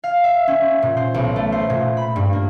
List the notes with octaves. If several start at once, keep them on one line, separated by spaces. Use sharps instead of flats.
F5
E5
C#4
A#2
C5
B1
A3
C5
A#2
B5
G2
A#3